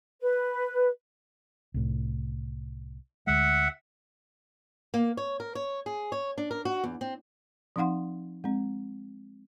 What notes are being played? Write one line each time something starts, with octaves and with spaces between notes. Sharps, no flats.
B4
C2 A2
D2 G#3 E5 F#5
A#3
C#5
A#4
C#5
G#4
C#5
D4
A#4
F#4
E2
C4
F3 C4 D#4 F5 F#5 C6
G#3 C4